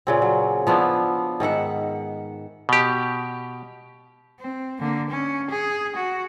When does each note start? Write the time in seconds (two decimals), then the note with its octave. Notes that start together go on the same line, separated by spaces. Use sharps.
0.07 A#2 C#3 C4
0.22 F#3
0.67 F3 B3 D4 E4
1.40 G#2 D#3 E5 F#5
2.69 B2 G4
4.40 C4
4.80 D3 A#3
5.10 C#4
5.50 G#4
5.95 F#4